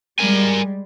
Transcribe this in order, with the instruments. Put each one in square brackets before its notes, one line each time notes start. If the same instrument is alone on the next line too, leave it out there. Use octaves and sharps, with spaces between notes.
[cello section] G3 G#3 [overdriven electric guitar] A#4 G#5